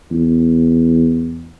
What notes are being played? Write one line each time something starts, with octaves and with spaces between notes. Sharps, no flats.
E2